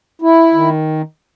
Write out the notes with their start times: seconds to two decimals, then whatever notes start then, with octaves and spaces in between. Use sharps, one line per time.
0.22 E4
0.54 D#3